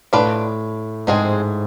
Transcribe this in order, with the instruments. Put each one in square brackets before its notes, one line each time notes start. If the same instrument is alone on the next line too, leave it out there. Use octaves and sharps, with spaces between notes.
[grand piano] A2 [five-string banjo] D4 F4 B4 D5
[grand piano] G#2 [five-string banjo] F3 G#3 C4 G#4